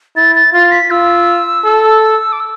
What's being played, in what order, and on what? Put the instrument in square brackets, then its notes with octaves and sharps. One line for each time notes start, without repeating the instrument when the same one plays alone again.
[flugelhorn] E4 [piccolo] A6
[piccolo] A6
[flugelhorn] F4 [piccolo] A6
[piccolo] B6
[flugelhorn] F4 [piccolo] E6
[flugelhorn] A4
[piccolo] D6
E6